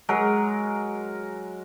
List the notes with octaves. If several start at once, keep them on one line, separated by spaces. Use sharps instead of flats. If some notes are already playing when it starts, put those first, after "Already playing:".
F#3 G#3 A#4